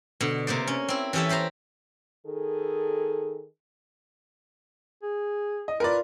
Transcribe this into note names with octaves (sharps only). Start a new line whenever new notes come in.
B2 D3
C3 A#3 C5 D5
C#4
C4 E4
E3 C#4 G4 A4 E5
E4 G4 C5 A#5
D#3 G#4 A4
G#4
D#5
F4 A#4 B4 D5